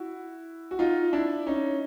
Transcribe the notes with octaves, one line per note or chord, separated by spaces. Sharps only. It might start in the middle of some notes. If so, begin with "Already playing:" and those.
Already playing: E4 F#4
F#4
D#4 F4
D4 E4
C#4 D#4